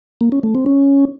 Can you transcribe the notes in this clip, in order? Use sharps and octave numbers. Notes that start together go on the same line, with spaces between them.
A#3
C#4
A3
C4
C#4